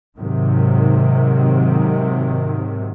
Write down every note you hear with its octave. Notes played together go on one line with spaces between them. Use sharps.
G#2 C3 D#3 F#3